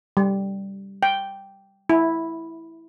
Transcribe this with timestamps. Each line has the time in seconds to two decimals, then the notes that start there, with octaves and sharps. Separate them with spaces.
0.17 G3
1.03 G5
1.90 E4